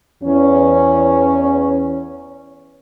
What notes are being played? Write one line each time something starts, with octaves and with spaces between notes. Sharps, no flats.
E2 C#4